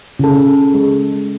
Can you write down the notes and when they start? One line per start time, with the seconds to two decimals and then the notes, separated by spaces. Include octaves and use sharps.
0.19 C#3 A4
0.74 G#3